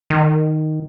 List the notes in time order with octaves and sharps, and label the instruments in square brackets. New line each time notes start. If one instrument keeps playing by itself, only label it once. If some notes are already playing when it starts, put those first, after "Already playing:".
[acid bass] D#3